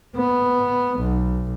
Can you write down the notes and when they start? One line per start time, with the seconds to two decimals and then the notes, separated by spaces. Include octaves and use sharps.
0.15 B3
1.00 B1